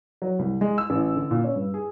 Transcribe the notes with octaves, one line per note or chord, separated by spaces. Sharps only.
F#3
C2
G#3
E6
A1
D3
A#2
C#4
G2
G#4